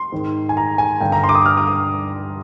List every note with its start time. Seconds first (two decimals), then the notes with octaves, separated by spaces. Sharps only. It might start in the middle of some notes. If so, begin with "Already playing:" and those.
Already playing: C6
0.12 G#2 D#3
0.49 G#5
0.57 A#5
0.78 G#5
1.00 G2 D3 G5
1.12 A#5
1.24 C6
1.29 D6
1.35 D#6
1.46 F6
1.57 D6
1.67 D#6